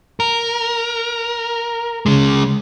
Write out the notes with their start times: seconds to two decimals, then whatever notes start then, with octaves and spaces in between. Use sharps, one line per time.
0.20 A#4
2.06 C#3 G#3